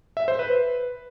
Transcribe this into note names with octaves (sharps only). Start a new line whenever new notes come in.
E5
C5
B4